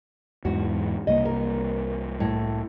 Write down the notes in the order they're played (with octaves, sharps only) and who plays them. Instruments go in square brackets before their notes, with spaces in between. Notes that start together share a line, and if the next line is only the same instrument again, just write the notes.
[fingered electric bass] E2 G#2 E3 [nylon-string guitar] F#4
[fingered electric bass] C2 A#3 [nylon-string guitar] D#5
[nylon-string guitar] A#4
A2